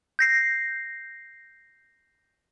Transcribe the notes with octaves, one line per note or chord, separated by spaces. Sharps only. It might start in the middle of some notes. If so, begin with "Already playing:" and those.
G6 A#6 C7